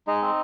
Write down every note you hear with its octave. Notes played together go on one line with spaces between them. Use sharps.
G#3 D#4 D#5
C4